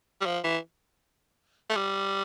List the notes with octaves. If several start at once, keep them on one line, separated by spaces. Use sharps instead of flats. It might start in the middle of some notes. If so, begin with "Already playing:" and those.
G3
F3
E3
A3
G3